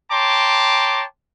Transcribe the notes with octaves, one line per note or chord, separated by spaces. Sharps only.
C#5 G5 A5 A#5 C6 D6